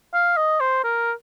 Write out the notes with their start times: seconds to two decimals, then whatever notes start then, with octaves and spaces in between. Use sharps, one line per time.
0.14 F5
0.37 D#5
0.60 C5
0.84 A#4